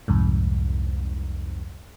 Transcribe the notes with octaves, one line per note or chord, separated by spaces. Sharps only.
C2 F2 G#2